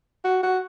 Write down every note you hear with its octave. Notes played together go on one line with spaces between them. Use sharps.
F#4
F#4